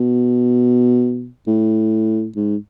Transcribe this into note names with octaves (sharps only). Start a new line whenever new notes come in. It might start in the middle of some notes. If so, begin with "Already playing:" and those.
Already playing: B2
A2
G#2